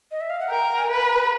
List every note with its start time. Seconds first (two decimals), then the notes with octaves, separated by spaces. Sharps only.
0.11 D#5
0.21 E5
0.30 F5
0.40 F#5
0.49 A#4 G5
0.77 G#5
0.91 B4
1.05 A#5